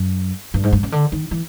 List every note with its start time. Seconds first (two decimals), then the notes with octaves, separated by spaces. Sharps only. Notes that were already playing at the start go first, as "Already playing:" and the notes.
Already playing: F#2
0.54 G2
0.63 G#2
0.72 G2
0.83 C#3
0.92 D3
1.12 D#3
1.31 E3